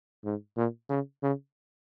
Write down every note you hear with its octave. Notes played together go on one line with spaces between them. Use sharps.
G#2
A#2
C#3
C#3